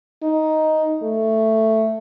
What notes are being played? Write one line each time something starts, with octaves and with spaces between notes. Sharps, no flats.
D#4
A3